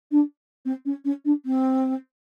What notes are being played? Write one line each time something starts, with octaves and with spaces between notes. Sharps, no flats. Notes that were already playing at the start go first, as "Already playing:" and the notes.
D4
C4
C#4
C#4
D4
C4